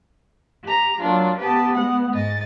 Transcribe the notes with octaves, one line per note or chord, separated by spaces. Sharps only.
G4 A#5
F#3 A#3 D4 F4
B3 G4 B4 A5
G#3 F#5
G#2 D#5 A6